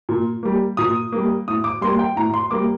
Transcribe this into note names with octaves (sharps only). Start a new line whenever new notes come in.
A#2
G3 A#3
A#2 D#6
G3 A#3
A2 D#6
D6
G3 A#3 C6
G5
A2 A#5
C6
G3 A#3 D6